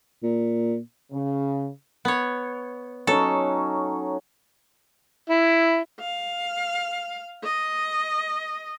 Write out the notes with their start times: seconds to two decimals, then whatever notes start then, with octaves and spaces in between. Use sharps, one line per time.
0.23 A#2
1.12 C#3
2.05 B3 C#5
3.07 F#3 C#4 D#4 A4
5.30 E4
5.99 F5
7.43 D#5